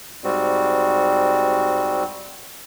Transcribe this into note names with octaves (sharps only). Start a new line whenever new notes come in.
G#2 G3 C4 F#4